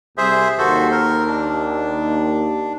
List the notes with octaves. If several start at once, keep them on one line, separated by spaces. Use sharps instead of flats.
C2 G#4 C5 E5
D#2 F#4 A4 C5
A#4
D4